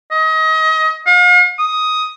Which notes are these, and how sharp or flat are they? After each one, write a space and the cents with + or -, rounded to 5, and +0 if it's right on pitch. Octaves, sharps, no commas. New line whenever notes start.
D#5 +30
F5 +45
D#6 +10